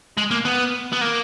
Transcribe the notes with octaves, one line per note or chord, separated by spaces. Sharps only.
G#3
A#3
B3
B3
A#3